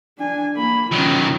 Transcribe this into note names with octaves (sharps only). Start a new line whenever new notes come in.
D4 G#5
A#3 B5
D#3 F#3 C#4 F4